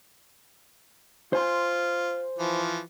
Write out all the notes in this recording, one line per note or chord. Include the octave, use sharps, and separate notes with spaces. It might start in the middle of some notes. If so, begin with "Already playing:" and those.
F4 C5 G#5 C6
E3 F3